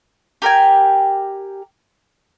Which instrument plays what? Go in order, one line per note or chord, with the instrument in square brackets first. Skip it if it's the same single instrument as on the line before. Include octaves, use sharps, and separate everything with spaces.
[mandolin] G4 A#4 G5 G#5